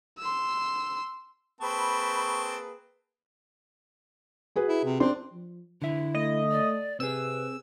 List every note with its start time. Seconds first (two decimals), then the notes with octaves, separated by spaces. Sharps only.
0.19 C6 E6
1.61 A#3 C4 G#4 B4 A5 B5 C#6
4.56 F#4 G#4 B4
4.69 E4
4.85 C3
5.00 C4 D4 C6
5.32 F3
5.82 F1 D3 E4 E5
6.15 A3 D#5
6.51 D5
7.00 C3 C4 G#4 B4 E6